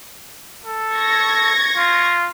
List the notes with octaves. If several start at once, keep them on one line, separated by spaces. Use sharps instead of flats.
A4
C#6 G#6 A#6
F4